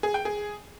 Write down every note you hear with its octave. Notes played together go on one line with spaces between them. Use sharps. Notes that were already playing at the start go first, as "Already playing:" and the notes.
G#4
G5
G#4